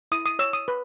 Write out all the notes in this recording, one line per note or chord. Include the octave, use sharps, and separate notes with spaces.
E4 D#6
D#6
C#5 E6
D#6
B4